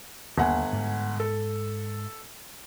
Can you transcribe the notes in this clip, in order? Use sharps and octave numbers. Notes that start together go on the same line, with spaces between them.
G1 D#2 A#3 F#5 G#5
G#2
A4